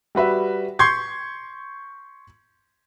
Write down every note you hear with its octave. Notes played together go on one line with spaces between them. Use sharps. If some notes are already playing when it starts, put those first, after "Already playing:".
G3 F#4 B4 E5
C6 C#6 G6 G#6 C7